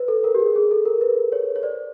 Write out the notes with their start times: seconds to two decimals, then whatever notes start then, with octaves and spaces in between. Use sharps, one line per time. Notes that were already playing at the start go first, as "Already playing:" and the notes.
Already playing: B4 C5
0.08 A4
0.24 A#4
0.35 G4
0.40 G#4
0.56 G#4
0.71 A4
0.85 A#4
1.01 B4
1.32 C#5
1.56 C#5
1.63 C5 D5